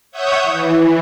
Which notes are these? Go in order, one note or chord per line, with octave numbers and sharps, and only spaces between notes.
C#5 E5 F#5 C#6 D#6 G6
E3